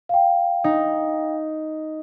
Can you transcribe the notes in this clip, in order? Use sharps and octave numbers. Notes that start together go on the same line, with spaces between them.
F5 G5
D#4